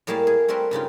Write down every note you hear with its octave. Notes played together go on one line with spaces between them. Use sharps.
A2 G3 A#3 G#4 F5 A5
G#4
G3 A3 C4 A#4 B4
G2 C#3 D#4 F4